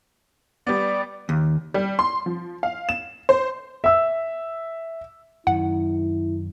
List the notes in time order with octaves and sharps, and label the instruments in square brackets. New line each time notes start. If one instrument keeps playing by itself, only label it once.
[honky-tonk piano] G3 B3 [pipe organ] D5
[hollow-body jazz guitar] D#2
[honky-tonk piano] G3
C6
F3
F5
E7
C5
[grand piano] E5 E6
[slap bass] F#2 D#3 [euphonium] E4 [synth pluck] F#5